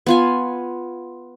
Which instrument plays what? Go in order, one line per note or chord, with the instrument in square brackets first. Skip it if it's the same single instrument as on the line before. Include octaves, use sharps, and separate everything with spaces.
[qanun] B3 F4 G#5